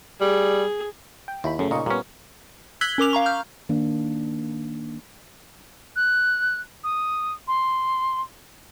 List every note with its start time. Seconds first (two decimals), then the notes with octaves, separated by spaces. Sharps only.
0.21 G3 G#4
1.28 G5
1.44 D#2 E4 B5
1.59 F#2 C#3 A3
1.71 A#2 C#3 D#4 D#5 C#6
1.86 A#2 G3 B3 C#4
2.81 E6 F#6 G#6 B6 F#7 G7
2.98 C#4 A#4 D6 F7
3.13 F5 A#5 C#6
3.26 F6 G6
3.69 D#3 A#3 D4
5.96 F#6
6.83 D#6
7.47 C6